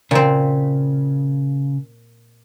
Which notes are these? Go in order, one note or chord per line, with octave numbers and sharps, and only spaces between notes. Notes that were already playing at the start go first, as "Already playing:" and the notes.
A#2 C#3 C4